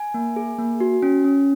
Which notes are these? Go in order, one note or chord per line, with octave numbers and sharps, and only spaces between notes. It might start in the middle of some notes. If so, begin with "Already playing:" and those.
Already playing: G#5
A#3
G#4
A#3
F#4
C#4
C#4